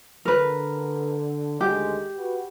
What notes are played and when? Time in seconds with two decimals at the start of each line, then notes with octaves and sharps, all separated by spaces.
0.25 D3 A#4 B4
1.61 D2 D#3 G#3 G4
2.16 F#4 B4